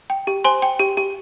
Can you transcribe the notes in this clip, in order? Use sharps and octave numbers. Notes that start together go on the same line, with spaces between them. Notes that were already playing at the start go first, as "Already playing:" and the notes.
G5
G4
C5 G#5 C6
G5
G4
G4